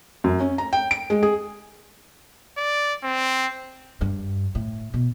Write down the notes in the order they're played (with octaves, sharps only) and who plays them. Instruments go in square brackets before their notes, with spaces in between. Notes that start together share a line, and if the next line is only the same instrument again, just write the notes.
[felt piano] F#2
C#4
A#5
G5
D7
G#3
G#4
[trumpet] D5
C4
[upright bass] G2
A2
B2